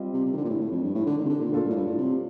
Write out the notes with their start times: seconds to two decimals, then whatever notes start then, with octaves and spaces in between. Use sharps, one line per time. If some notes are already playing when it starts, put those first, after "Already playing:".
Already playing: G3 C4 F4 D#5
0.14 C3
0.25 C3
0.32 D#3
0.37 D3
0.45 A#2
0.49 A2
0.60 A2
0.72 F2
0.83 G2
0.95 A2
1.06 D3
1.18 D#3
1.25 C3
1.29 D3
1.40 A#2
1.52 A#2 A3 D4 F4 A4
1.64 G2
1.70 A2
1.76 G2
1.87 A2
1.98 C3